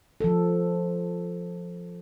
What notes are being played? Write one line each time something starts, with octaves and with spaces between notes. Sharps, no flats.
F3 A4